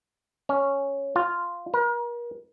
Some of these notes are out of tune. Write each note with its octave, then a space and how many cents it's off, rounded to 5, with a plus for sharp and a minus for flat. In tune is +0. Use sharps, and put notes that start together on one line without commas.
C#4 -5
F4 -5
A#4 +40